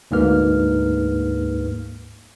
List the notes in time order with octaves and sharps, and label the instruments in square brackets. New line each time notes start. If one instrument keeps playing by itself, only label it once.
[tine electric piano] D2 G#2 A#3 B4 F6